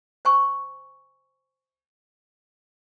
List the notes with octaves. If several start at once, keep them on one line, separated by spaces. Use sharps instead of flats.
C5 G#5 C#6